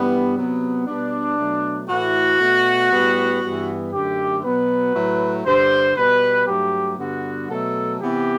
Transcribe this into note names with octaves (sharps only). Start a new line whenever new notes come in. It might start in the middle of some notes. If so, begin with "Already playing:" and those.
Already playing: G2 E3 G3 B3
C3 F#3 B3
B2 G3 B3 D4
B2 F#3 A3
A2 E3 A3 F#4
B2 A3
A2 G3 B3
G2 E3 G3 B3
F#2 D3 A3 G4
B2 F#3 B3 B4
A2 F#3 A3
G2 D3 G3 C5
B2 G3 B3 B4
G2 F#3 A3 G4
G2 D3 G3 B3 F#4
B2 F#3 A3 A4
C3 E3 B3 G4